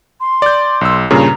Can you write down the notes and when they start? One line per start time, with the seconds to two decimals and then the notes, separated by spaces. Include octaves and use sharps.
0.21 C6
0.42 D5 G6
0.81 B1 E6
1.11 G2 A#2 C#3 A#5